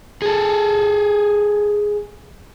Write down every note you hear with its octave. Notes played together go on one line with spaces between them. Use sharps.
G#4 A4